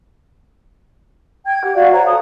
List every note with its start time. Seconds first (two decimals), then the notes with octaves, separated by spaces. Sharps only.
1.45 G5 G#6
1.61 G4 F#5
1.75 F#4 D5 F5 F#5
1.91 C5 C#5 F#5 A#5
2.05 A4 D#6